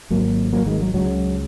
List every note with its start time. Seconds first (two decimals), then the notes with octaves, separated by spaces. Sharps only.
0.10 G#1 G#2 F#3 A#3
0.53 F#3 A#3
0.66 D#3 G#3
0.80 F#3
0.94 C#2 C#3 F#3